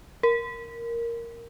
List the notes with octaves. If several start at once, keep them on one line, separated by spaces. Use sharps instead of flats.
A#4